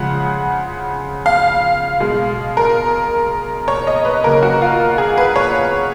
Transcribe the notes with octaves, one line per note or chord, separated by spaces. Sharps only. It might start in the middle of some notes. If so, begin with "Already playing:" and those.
Already playing: C#3 F3 G#3 F#5
F5
B2 G#3
A#4
C#5
D#5
B4
C#3 F#3 A#3 A#4
F#4
F4
G#4
B4
C#5